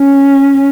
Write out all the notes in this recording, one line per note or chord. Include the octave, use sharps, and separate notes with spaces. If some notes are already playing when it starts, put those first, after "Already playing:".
Already playing: C#4